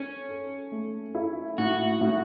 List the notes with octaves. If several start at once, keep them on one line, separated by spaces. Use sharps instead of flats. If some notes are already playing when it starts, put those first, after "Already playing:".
Already playing: C#4 A4
A4
A3
E4
A2 F#4
A2